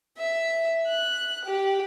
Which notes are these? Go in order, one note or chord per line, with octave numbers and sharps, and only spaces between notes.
E5
F#6
G4